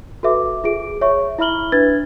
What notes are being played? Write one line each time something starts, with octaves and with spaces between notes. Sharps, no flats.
F#4 A4 B4 E5 D6
F4 G#4 D7
C#5 E5 C#6
E4 E5 B5 F6 F#7 G7
D4 B4 G#6 A6